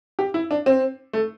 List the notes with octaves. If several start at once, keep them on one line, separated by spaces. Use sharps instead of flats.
G4
E4
D4
C4
A3